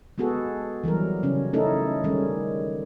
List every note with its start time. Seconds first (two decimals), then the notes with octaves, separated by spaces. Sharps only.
0.18 G#3 B3 F#4 G#4 A4
0.84 E3 F#3 G3 A#4
1.23 C#3 C#4
1.53 A3 C#4 D#4 E4 A4 A#4
2.04 D#3 G3 G#3 C#4